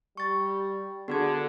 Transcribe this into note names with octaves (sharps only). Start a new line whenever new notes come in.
G3 C#6 A6
D3 B3 F#4 G#4 G#6